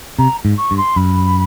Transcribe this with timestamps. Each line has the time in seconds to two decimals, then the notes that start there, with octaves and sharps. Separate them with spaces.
0.19 C3 A#5
0.45 G#2
0.58 C#6
0.71 G2
0.77 C6
0.96 F#2 B5